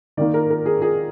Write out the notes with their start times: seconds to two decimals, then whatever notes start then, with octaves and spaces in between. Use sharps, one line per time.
0.17 D#3 A#3 D#4 D5
0.34 A#4
0.50 A#4
0.66 G#4
0.82 G#4